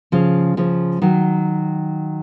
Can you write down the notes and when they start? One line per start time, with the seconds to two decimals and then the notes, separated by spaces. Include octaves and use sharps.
0.12 C#3 F3
0.57 C#3 F3
1.02 D#3 F#3